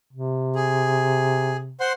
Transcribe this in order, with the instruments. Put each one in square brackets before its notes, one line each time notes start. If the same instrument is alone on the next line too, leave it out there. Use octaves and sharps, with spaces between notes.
[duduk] C3
[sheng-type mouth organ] G#4
C5 F#5 C6